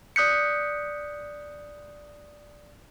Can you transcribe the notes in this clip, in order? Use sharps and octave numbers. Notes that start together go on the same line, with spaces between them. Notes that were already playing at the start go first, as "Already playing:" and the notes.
D5 D#6 F#6 G6 B6 C#7